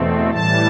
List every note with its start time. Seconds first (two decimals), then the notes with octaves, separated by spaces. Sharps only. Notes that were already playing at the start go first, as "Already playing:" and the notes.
Already playing: E2 B2 A3 C4
0.30 A2 E3 G3 A5